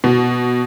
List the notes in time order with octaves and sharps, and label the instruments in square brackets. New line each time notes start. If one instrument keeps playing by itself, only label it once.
[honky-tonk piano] B2